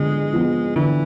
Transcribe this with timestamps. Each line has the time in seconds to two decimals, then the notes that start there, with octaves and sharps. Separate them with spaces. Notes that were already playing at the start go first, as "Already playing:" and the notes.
Already playing: D3 F3 G#3 B3
0.33 F3 B3
0.76 D3 E3